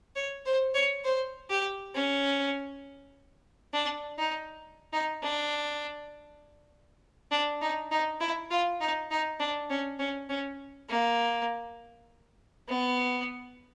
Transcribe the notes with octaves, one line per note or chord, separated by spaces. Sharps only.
C#5
C5
C#5
C5
G4
C#4
D4
D#4
D#4
D4
D4
D#4
D#4
E4
F4
D#4
D#4
D4
C#4
C#4
C#4
A#3
B3